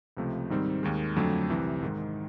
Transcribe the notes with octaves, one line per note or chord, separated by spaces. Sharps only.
C#2 C3 F3 A3
G#2 D#3 G3 C4
D#2 D#3 G#3
F2 D3 F#3 A3
C2 C3 E3
G#2 D#3 G#3